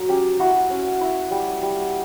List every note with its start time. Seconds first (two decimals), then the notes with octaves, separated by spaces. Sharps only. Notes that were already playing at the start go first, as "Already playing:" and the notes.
Already playing: F#3 A#4
0.08 C#4 G4
0.40 E4 F#4
0.70 C#4
1.01 E4
1.31 G3
1.63 G3